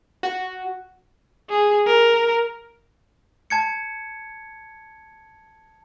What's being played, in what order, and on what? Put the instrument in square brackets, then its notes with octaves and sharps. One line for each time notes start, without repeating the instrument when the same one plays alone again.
[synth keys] F#4
[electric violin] G#4
A#4
[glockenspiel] A5 G#6 C#7